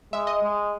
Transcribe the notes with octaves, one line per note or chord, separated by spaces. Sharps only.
G#3 E5
D#5
G#3